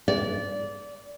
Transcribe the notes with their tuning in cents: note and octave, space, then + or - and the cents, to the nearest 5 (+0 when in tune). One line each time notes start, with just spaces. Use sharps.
D5 -20